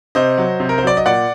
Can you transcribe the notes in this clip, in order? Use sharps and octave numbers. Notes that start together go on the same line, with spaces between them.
C3 C5 D#5
F#3
C3
A#4
C5
F#3 D5
D#5
A#2 D5 F#5